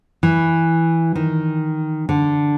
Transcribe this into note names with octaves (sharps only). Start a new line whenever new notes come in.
E3
D#3
D3